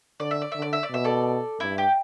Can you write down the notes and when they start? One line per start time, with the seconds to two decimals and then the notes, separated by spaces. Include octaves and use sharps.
0.20 D3 D5
0.31 E5
0.42 D5
0.52 D3 E5
0.62 D5
0.73 E5
0.83 D5
0.91 B2 E5
1.04 A4 D5
1.60 G2 E4
1.78 G4